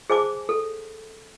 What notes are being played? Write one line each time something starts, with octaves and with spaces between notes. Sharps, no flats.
G#4 C5 G#5 A5 D6
A4